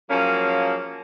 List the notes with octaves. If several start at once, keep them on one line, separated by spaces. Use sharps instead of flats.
F3 F#3 A#3 C#4 G#4 A#5